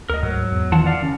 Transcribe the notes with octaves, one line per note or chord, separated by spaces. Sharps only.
D2 A#4 D#5
G#2 F#3
E2
D#3 E3 F4 F#5 A5
D5 F5 F#5
C#3 C#4